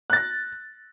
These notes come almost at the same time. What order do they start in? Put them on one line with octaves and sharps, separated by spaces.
F#6 A6 A#6